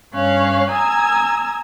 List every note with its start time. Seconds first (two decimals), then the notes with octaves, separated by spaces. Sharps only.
0.14 G2 C#4 C#5 F5 F#6
0.70 G#5 A#5 D#6 E6 G#6